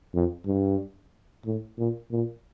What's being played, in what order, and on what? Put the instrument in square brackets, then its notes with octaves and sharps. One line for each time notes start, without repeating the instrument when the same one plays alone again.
[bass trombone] F2
G2
A2
A#2
A#2